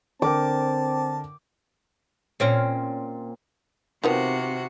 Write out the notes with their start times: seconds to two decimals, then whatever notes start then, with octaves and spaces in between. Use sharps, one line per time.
0.22 D3 C4 A#4 G5 A5 D6
2.40 A#2 C4 C#4
4.04 C3 D#3 F3 B3 F#4